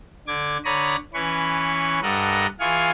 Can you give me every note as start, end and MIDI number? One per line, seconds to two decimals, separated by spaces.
0.27 0.58 50
0.27 0.58 86
0.27 0.58 92
0.65 0.96 50
0.65 0.96 73
0.65 0.96 74
0.65 0.96 82
0.65 0.96 83
0.65 0.96 87
1.14 2.00 52
1.14 2.00 61
1.14 2.00 71
1.14 2.00 85
2.02 2.46 43
2.02 2.46 69
2.02 2.46 70
2.02 2.46 75
2.02 2.46 78
2.60 2.91 52
2.60 2.91 65
2.60 2.91 68
2.60 2.91 77
2.60 2.91 80
2.60 2.91 85